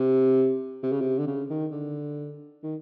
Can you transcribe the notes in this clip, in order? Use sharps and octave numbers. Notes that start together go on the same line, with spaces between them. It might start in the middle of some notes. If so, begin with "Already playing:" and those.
Already playing: C3
C3
C#3
C3
D3
C#3
D#3
D3
D#3